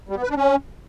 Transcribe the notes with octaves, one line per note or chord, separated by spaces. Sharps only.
G3
B3
B4
D4
C#4